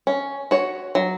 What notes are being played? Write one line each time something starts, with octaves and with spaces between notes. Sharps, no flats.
C#4
F#4 C#5
F#3